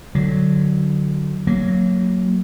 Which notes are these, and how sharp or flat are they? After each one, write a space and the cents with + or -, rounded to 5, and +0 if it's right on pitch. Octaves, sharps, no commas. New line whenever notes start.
D3 +10 F#3 +0
F#3 +0 A#3 -20